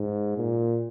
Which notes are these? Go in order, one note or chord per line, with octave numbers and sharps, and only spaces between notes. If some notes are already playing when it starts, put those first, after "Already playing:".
Already playing: G#2
A#2